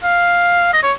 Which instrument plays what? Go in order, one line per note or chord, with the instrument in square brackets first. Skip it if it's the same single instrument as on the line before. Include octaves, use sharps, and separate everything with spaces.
[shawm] F5
D#5
C#5